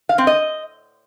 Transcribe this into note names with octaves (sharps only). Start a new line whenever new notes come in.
F5
C4
D#5